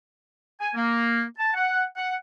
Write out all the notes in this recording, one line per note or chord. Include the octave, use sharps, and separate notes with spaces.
G#5
A#3
A5
F#5
F#5